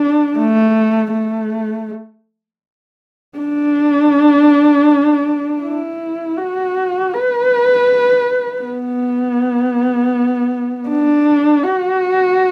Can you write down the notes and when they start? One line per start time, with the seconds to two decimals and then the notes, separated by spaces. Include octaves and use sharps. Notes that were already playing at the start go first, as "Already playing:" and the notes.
Already playing: D4
0.37 A3
1.13 A3
3.38 D4
5.63 E4
6.37 F#4
7.13 B4
8.63 B3
10.89 D4
11.64 F#4